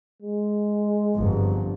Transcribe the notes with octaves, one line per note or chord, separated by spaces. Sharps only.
G#3
G1 F2